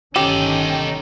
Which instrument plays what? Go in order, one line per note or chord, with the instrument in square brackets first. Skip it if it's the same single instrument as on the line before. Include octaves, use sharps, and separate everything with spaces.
[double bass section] G1 D#3 C#4 [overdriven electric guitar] D#4 A4 [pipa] G4